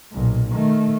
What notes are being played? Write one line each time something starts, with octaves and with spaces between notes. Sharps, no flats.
B1 A#2
D#3 A3